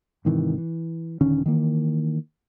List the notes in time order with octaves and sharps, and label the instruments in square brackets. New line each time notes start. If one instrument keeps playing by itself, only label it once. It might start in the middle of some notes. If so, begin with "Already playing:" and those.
[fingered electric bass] G#2 C3 D#3 E3
E3
D#1 D3 D#3 C#4
D#3 E3 A#3